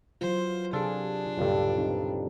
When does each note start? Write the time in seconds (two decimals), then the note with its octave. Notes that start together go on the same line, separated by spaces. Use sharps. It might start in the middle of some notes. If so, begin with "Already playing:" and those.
0.21 E3 F#3 F4 C5
0.73 C3 D4 F4 G#4 A4
1.38 C#2 G2 A#2 E3 A4
1.77 C4 D#4